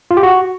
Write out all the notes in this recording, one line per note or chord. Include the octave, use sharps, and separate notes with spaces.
F4
G4
F#4